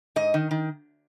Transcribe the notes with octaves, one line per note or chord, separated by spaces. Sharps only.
G#2 D#5
D#3
D#3